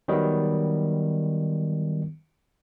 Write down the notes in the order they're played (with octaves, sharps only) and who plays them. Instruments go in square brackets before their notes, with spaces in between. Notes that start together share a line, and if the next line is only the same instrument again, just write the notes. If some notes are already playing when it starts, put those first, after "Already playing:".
[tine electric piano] D#3 F#3 G3 B3